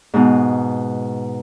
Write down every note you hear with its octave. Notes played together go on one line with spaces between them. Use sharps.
G#2 B2